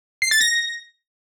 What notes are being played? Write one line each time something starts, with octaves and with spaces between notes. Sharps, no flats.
C7
A6
A#6